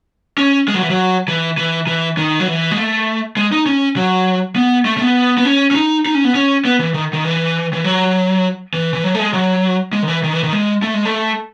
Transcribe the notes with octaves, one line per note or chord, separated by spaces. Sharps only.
C#4
G#3
F#3
E3
F#3
E3
E3
E3
D#3
F#3
E3
G#3
A3
G#3
D#4
C#4
F#3
B3
A3
A3
B3
B3
C#4
C#4
D#4
D#4
C#4
B3
C#4
B3
E3
D#3
D#3
E3
E3
F#3
E3
E3
F#3
A3
G#3
F#3
G#3
D#3
E3
D#3
E3
D#3
G#3
A3
G#3
A3